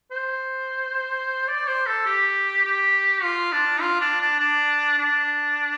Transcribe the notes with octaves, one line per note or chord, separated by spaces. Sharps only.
C5
D5
C5
A4
G4
G4
F4
D4
F4
D4
D4
D4
D4